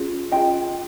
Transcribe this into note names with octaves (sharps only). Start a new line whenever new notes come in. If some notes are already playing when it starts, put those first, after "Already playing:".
Already playing: C#4 F4 G#4
C#4 F4 G#4 D#5 G5